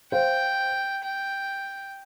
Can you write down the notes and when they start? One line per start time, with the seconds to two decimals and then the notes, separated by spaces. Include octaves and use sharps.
0.12 C5 F5 G5
1.03 G5